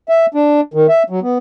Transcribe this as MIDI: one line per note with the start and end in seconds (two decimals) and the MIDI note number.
0.09 0.26 76
0.34 0.61 62
0.74 0.87 51
0.89 1.03 76
1.10 1.20 54
1.22 1.38 59